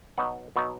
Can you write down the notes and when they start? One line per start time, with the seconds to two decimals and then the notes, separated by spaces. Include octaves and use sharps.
0.18 B2 F#3 B3 D#4 F#5
0.56 B2 F#3 B3 D#4